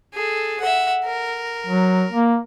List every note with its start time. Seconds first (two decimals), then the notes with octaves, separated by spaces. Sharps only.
0.14 G#4 A4
0.60 E5 F#5
1.05 A#4
1.66 F#3
2.13 A#3